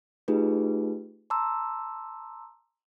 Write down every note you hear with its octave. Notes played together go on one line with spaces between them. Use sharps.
A3 D#4 F4 G4 G#4 B4
A5 A#5 C6 D6 E6